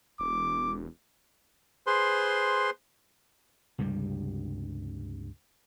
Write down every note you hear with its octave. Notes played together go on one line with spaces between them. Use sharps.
E1 D6
G#4 B4 C5 C6
C#2 G2 C3 G3